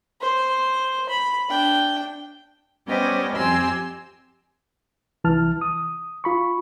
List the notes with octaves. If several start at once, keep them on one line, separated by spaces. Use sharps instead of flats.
C5
B5
D4 G5
G3 B3 C#4 G4 C5 D#5
F2 C4 G4 G#5 C6 E6
C2 E3 A5 F6
D#6
F4 B5 C#6